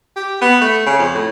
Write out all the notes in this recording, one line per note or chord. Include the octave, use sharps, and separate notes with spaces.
G4
B3
A3
C#3
F2
A2